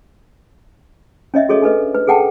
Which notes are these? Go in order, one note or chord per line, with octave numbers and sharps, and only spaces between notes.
C#4 C#5 D#5 E5
F#4 G#4 A4 C#5 D#5
D4 A4 B4 D#5
B4
G#4 A4 F#5 G5 A5